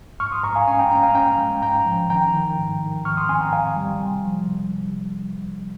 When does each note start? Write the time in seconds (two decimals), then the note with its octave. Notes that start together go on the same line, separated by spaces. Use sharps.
0.20 G#2 C#6 F6
0.32 C6 D#6
0.43 G#2 A#5 C#6
0.55 F5 G#5
0.67 C#4 F5 G#5
0.79 G5 A#5
0.91 C#4 G5 A#5
1.03 F5 G#5
1.15 C#4 G5 A#5
1.38 G#3
1.62 G#2 G5 A#5
1.86 F3
2.10 D#3 G5 A#5
2.34 D#3
2.58 G#2
2.82 D#3
3.05 G#2 C#6 F6
3.17 C6 D#6
3.29 C4 G#5 C6
3.41 G5 A#5
3.52 G#2 F5 G#5
3.76 G3
4.00 C3
4.24 F3
4.48 C3